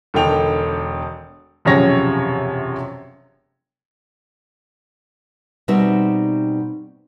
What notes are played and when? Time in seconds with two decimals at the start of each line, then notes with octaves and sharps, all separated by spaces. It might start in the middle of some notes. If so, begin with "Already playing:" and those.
0.14 E1 D3 D#3 A4 G5 F7
1.65 E1 F#2 C3 F3 C#5 A#6
5.68 B2 G3 C4 D#4 E5